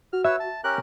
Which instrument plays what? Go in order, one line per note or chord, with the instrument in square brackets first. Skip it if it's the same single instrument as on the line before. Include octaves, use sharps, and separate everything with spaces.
[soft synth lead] F#4 [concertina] F6
[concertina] B4 C#5 E6 [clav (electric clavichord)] E5
[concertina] A5
[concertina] C#4 G4 A#4 [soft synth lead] F#6